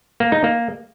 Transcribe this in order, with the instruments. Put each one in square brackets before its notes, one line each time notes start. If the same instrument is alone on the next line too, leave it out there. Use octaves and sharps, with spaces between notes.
[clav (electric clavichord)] A#3
D#4
A#3